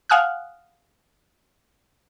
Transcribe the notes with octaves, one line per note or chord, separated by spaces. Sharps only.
F5 F#5 G#5 D#6 F6 F#6